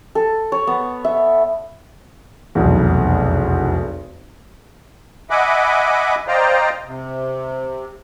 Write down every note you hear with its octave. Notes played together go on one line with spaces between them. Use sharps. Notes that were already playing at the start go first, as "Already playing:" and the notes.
A4
C#5
B3
E5
F1 B1 E2
D#5 E5 F#5 G#5 B5 D6
C5 D5 D#5 F5 G5 A#5
C3